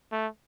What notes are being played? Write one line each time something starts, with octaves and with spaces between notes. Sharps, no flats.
A3